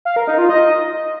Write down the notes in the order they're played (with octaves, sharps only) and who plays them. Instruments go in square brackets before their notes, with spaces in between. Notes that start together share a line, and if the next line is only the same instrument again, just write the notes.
[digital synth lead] F5
A#4
D#4
F4
D#5